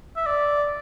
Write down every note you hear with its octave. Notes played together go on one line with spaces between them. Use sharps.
E5
D5